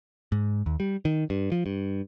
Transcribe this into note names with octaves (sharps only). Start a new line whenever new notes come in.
G#2
D#2
G3
D#3
G2
F3
G2